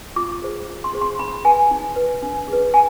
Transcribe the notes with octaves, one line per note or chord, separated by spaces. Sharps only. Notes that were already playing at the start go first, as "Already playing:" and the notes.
F4 D6
G#4 C5
F4
C6
G#4 C5
C6
D#4 B5
B4 G#5
D#4
B4
D4
G#4
B4
G#5